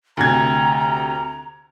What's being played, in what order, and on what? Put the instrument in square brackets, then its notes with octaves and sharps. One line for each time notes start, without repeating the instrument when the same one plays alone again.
[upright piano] D2 C3 G#6 [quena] A#5